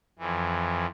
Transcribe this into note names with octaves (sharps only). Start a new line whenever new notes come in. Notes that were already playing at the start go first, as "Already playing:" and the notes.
F2 E3